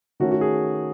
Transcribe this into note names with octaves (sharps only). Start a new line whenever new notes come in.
D#3 A3 C#4 F#4
F#4
G#4